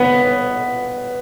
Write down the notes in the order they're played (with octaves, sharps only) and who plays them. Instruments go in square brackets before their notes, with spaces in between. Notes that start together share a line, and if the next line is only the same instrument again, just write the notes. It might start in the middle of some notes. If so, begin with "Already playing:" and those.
Already playing: [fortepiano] B3